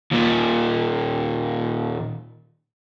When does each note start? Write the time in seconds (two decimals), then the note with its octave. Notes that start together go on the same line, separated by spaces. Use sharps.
0.11 D#2 A#2